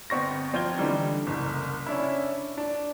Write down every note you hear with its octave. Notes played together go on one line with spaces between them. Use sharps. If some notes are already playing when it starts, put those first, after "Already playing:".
G1 B3 C4 C#6 A#6
F3 C4 F4 C5 G#6 G7
D3 E3 G3 D#4
F#1 C2
C#4 D4 E4
D4